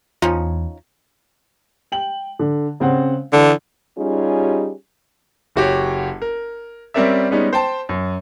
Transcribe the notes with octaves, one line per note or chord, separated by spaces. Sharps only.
E2 F3 C#4 D#4 F4
G5 F#7
D3
C#3 C4 F#5
D3 E3
G3 C#4 D#4 F4 G4 G#4
F#1 F#4 G4 C#5
A#4
G3 C4 C#4 A#4 D5 E5
G3 G#3 B3 C#4 D#4
C5 G5 A5
F#2